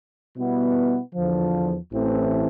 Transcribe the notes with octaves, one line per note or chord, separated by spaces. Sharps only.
B2 G3 B3 E4
E2 D3 F3
A1 A2 E3 A3 C4